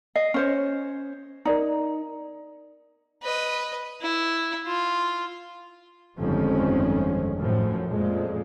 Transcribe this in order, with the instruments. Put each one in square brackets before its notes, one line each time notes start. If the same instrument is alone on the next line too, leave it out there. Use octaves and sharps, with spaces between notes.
[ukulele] D#5 [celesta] C7
[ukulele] C#4 C5 C#5
[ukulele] D#4 [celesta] A#4 D5 A#5
[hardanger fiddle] B4 D#5
E4
F4
[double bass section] G1 F2 D#3 F3 G#3 C#4
F#2 A2 F3
F2 A#2 F3 G#3